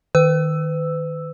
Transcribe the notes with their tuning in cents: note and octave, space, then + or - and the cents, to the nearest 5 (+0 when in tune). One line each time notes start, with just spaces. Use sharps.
D#3 +0 B4 +40 E6 +0